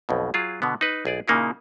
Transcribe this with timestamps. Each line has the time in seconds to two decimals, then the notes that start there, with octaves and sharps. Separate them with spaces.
0.09 B1 F2 B2
0.34 F#3 F4 G#4
0.62 B2 D3 B3
0.81 D#4 B4
1.05 B1 G#4 D5
1.28 A#2 C#3 A#3 D#4 E4